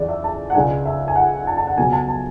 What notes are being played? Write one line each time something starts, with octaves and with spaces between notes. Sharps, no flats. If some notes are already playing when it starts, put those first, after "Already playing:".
Already playing: E2 C#3 E3 D5
E5
A5
F#5
C#2 C#3 G#3 D4 G#5
E5
G#5
F#5
A5
A5
F#5
C#2 C#3 F#3 B3 G#5
A5
A5